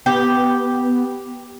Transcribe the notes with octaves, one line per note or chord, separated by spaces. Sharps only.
B3 G4